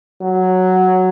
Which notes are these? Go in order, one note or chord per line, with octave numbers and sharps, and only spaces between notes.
F#3